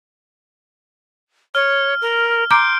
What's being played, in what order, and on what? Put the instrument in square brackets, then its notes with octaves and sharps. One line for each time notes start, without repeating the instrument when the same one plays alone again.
[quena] C#5 [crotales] F6
[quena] A#4
[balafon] A#5 D6 [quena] C6 [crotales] G6 D7